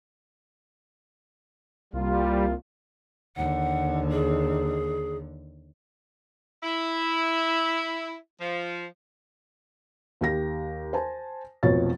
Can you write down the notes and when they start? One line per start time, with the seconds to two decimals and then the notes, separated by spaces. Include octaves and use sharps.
1.93 C2 G3 A#3 F4
3.36 D#2 D3 F#5
4.12 G#4
6.63 E4
8.40 F3
10.21 D#2 G4 A#6
10.93 C5 G#5 A5
11.63 F1 B1 F3 C4 C#5 A6